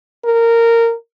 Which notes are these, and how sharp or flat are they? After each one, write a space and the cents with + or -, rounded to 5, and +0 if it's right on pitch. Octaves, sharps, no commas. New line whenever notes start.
A#4 -15